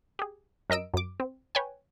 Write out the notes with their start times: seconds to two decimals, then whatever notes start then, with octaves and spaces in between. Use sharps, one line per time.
0.19 G4 G#4
0.70 F#2 A#4 D#5 E6 D7
0.94 F#2 D6
1.20 C4
1.55 B4 C#5 G5 G#5